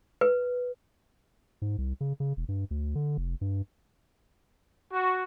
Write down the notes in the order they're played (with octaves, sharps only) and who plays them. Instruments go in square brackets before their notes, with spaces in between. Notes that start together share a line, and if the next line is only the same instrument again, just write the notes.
[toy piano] B4
[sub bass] G#2
C2
C#3
C#3
E1
G2
D2
D3
F1
G2
[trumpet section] F#4